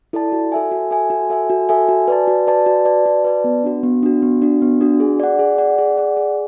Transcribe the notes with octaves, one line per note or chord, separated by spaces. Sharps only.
E4 A4 D5 A5
F#4
A4 E5 G#5
F#4
A4 E5 G#5
F#4
A4 E5 G#5
F#4
A4 E5 G#5
F#4
B4 D5 A5
F#4
B4 D5 A5
F#4
B4 D5 A5
F#4
B4 D5 A5
B3
D4 F#4
B3
D4 F#4
B3
D4 F#4
B3
D4 F#4
G#4
D5 F#5
G#4
D5 F#5
G#4
D5 F#5
G#4